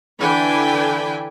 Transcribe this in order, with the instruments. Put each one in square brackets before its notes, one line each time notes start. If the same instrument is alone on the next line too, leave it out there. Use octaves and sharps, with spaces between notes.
[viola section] D3 E3 D4 G5 G#5 B5